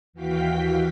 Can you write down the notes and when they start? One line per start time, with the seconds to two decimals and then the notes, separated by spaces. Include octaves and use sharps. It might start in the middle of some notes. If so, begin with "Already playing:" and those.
0.13 D#2 E3 F#4 F5 G5 B6